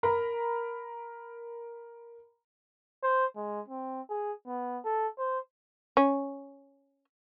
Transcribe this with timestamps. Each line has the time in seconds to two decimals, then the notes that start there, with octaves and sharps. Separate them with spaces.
0.03 A#4 A#5 B5
3.03 C5
3.36 G#3
3.68 C4
4.10 G#4
4.47 B3
4.84 A4
5.18 C5
5.97 C#4